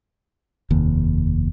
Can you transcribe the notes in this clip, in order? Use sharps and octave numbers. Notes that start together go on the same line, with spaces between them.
F1 D#2